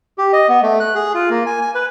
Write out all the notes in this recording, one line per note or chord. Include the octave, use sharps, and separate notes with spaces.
G4
D#5
B3
A3
F#6
G#4
F4
A#3
G#5
G#5
B4